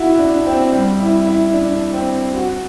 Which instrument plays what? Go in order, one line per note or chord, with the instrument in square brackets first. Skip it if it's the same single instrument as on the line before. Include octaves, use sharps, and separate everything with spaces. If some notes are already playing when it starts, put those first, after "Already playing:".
Already playing: [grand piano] E4 F#4
D4
C4
G3
E4
E4
D4
C4
F#4